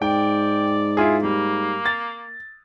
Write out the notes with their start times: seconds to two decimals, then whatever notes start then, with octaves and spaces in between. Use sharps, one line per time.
0.02 G#2 D5 G5
0.97 E4 F4 G#4
1.23 G3 A#3
1.85 A6